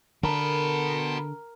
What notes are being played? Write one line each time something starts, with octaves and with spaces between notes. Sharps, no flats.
D3 F#4 A#4 B4 G5 A5 C6